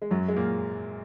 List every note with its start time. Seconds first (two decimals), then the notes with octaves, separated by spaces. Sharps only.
0.02 G#3
0.11 F#2 F#3
0.28 G#3
0.37 A#2 A#3